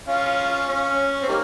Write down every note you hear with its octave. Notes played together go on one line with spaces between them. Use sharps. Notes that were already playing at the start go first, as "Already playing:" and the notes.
C#4 F4
C#4
C4
D#3 G3 A#3